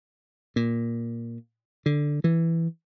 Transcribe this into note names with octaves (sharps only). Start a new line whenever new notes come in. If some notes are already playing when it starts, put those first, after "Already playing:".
A#2
D3
E3